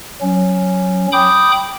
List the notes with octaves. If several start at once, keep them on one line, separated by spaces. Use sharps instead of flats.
F#3 C#4
G5 B5 D6 D#6 G6